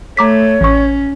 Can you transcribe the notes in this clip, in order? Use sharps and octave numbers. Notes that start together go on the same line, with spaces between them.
A3 C#5 A#5 D6 B6
A1 C#4 C#6